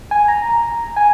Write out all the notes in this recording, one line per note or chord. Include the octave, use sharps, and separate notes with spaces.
G#5
A#5
G#5